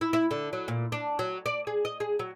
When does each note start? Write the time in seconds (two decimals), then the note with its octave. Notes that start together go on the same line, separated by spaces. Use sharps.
0.01 E4
0.13 E4
0.31 D3
0.53 F#3
0.68 A#2
0.92 D4
1.19 F#3
1.46 D5
1.67 G#4
1.85 D#5
2.00 G#4
2.19 F#3